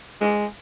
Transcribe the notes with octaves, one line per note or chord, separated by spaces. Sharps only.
G#3